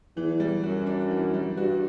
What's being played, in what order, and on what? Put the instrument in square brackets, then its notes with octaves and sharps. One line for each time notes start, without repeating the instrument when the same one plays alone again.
[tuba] E2 [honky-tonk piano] E3
[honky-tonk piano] G3
[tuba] F#2 [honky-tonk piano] F#4
[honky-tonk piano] D4
E3
G3
[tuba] G2 [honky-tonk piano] F#4